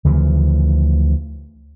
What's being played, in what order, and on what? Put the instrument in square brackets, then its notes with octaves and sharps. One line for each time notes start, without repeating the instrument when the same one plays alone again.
[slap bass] D2 C#3 E3 F3